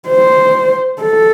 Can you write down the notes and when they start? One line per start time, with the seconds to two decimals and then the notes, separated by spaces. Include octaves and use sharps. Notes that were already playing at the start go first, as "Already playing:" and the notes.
0.08 C5
1.02 A4